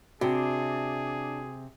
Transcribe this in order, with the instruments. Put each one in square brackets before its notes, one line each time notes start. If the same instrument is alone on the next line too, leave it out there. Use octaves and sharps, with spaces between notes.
[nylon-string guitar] C3 [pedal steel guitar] D4 [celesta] F#4 [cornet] G#4